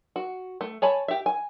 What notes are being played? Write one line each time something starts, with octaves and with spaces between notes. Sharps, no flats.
F#4
A3
C#5 G#5 A5 B5
G4 E5
G#5